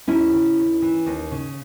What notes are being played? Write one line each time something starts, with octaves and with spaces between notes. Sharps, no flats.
D#2 C#4 E4
C#3
D#2
E3
D#2
C#3